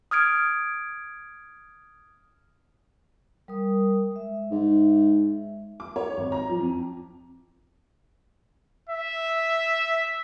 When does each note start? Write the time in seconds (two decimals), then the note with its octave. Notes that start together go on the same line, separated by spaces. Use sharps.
0.11 D#6 F6 G#6 D7
3.48 G3 A#4 D#6
4.11 G#3 E5
4.51 G#2
5.80 D6
5.96 C#5
6.17 G#1
6.32 A#5
6.49 F3
6.60 F2
8.89 E5